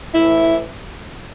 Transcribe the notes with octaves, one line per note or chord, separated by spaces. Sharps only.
A2 E3 E4